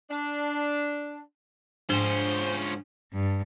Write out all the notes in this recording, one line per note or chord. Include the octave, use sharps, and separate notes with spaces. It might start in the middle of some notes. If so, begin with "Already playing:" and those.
D4
G#2 F3 C#4 D4 C5
G2